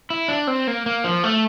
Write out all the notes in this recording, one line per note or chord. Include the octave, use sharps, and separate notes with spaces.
E4
D4
C4
A#3
A#3
F3
A3